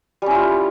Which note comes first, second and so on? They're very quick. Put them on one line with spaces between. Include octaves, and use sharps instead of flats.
G3 C#4 E4 F4